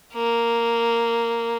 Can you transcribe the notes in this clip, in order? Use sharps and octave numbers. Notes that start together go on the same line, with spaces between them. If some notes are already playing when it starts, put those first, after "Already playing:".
A#3